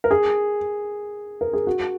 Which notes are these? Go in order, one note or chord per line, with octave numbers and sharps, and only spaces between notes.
A#4
G#4
A#4
G#4
F#4